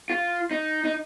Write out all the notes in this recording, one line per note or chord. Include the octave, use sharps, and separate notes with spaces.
F4
D#4
D#4